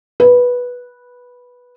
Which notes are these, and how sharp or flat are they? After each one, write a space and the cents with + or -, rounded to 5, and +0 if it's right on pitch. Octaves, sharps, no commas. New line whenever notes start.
B4 -10